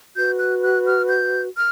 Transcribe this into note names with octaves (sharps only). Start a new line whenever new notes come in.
F#4 B4 G6
F#6
F#6
F6
G6
F6